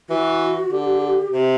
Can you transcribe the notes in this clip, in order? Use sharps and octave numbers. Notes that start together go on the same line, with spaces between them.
E3 F#4
D3 G4
C3 G4